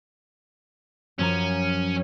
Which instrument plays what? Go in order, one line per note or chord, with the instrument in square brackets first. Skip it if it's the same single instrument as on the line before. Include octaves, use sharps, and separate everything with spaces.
[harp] F#2 F3 A#5 [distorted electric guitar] C#4